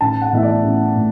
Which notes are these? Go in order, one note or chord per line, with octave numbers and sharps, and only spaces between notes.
A1 A5
F#5
A2 E3 B3 E5
D5
A1
A2